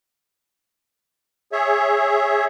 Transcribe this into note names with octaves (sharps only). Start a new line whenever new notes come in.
G#4 C#5 E5